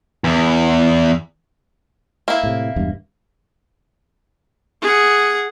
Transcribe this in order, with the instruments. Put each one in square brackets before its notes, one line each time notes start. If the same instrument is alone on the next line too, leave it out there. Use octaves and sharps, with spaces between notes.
[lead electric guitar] E2
[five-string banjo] A#3 E4
[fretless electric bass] A2 C3
E1 E2 G2
[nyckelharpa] G#4 F#5